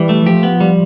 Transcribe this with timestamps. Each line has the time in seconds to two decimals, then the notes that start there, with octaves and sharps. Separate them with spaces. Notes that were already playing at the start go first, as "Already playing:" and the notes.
Already playing: E3 G3
0.09 A3
0.26 F3 G4
0.43 B3
0.61 G3